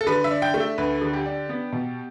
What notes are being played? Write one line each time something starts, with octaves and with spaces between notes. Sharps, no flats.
A4
D3 B4
E5
D4
G5
A3
E5
D2 B4
D3
G4
D4
B3
B2